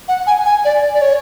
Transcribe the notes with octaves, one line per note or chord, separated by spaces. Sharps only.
F#5
G#5
G#5
D5
D5
C#5